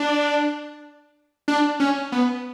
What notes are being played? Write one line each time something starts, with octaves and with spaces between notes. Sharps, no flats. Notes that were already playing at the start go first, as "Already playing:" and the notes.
Already playing: D4
D4
C#4
B3